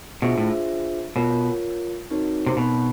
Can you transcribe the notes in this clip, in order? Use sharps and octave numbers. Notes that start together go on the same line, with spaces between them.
B2 D4 F4 G#4 C5 E5
A2
B2 F4 A#4 C#5
C4 D#4 F#4 A#4 C#5
C3
B2